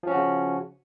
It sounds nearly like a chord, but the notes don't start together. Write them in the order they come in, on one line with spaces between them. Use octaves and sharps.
F3 C#4 F#4 C#3